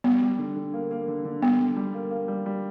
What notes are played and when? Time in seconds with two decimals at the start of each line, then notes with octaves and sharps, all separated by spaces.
0.04 G3 B3
0.22 G3
0.39 D3
0.56 D3
0.74 A#3
0.91 A#3
1.08 D3
1.25 D3
1.42 G3 B3
1.59 D3
1.76 G3
1.94 A#3
2.11 A#3
2.28 G3
2.46 G3